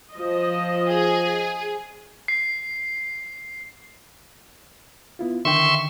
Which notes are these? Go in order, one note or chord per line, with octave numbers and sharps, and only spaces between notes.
F3 D#5
G#4
C7
B3 E4 F4
D3 D#3 E5 G5 C6 C#6